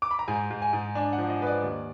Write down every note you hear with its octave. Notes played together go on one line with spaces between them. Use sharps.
D6
B5
A#5
G#2 G#5
G#2
G#5
G#2
D4 G#5
F#5
F3
D#5
G#2 B4
D5
D#2